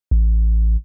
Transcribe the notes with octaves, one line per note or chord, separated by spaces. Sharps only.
A1